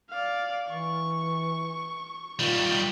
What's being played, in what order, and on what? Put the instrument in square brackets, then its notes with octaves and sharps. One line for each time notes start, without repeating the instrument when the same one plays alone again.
[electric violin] D5 F5
[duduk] E3 [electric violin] C#6
[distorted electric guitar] D#3 G3 [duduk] F4